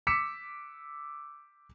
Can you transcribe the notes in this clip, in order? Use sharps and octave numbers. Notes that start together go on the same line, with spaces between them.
D6 E6 B6 C#7 E7